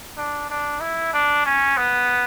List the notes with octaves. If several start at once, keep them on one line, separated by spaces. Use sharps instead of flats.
D4
D4
E4
D4
C#4
B3